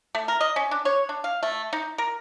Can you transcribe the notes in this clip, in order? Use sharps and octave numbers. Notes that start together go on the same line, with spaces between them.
A3
A#4
D#5
C#4
D4
C#5
D4
F5
A3
D#4
A#4